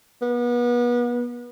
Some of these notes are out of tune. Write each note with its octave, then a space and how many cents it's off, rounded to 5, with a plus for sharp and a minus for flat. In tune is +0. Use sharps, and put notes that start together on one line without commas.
B3 -35